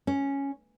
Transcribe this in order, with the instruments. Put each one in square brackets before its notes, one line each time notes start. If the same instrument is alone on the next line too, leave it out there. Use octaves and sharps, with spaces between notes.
[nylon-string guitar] C#4